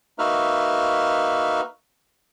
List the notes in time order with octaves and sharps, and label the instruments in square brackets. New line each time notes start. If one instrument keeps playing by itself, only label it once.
[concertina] A#3 D#4 F#4 B4 E5 F6